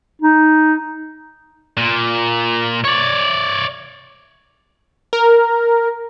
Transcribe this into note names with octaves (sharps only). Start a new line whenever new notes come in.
D#4
A#2
C#5 D5
A#4